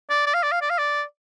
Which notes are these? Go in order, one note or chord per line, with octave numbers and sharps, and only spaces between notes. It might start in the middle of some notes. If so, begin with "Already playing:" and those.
D5
D5
F5
D5
F5
D5
F5
D5